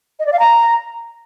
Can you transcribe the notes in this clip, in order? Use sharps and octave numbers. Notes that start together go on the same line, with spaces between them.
D#5
D5
F5
A#5